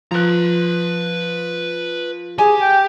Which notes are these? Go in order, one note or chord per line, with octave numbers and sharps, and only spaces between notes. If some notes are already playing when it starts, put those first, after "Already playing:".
F3 B4 A#5 F#6
G4 G#4 G#5
G5